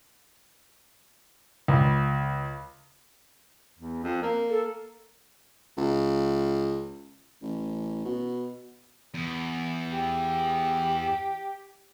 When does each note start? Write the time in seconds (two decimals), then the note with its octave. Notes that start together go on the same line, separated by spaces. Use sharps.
1.68 C#2
3.78 E2
4.03 F2
4.22 A#3
4.50 A4
5.77 C#2
7.42 A1
8.05 B2
9.14 E2
9.93 G4